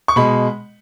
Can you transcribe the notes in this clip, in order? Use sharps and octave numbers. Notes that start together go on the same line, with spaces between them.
C#6
B2 G#3 B5